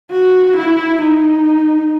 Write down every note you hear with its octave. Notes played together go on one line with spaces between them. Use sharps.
F#4
E4
D#4